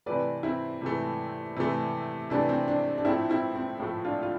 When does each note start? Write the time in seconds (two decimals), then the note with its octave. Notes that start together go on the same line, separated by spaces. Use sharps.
0.06 C3 E3 A3 B4 D5
0.43 C4 E4
0.81 C3 E3 A3
1.56 C3 E3 A3
2.30 C3 E3 A3 D4
2.49 C4
2.68 D4
2.98 D4
3.05 A2 F3 A3 C4 E4
3.30 C4 E4
3.55 C4
3.79 A2 F3 A3
4.05 D4 F4
4.23 F4